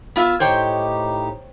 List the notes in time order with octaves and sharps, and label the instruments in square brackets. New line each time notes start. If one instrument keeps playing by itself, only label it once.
[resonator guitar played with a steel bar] B3 F4 E5
[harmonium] A2 D#4 G4 [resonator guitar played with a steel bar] C5 C#5 G5